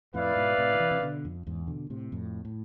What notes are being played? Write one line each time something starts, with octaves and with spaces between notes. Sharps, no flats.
F2 A2 E4 B4 D5 F5
G#2 B2
A2 C3
D3
C3 E3
C3
B2 D3
F2
E2 G#2
B2 D3
A2 C3
F2 A2
A2